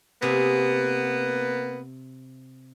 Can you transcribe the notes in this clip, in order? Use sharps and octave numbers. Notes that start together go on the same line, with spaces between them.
C3 A#3 B3 G#4 E5